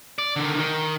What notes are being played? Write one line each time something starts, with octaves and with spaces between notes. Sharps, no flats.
D5
D3 D#3
D#3